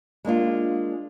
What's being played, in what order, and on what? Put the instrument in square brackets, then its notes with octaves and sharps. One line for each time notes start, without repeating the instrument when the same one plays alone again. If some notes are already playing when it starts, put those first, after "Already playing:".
[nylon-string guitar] G#3 A#3 D4 F4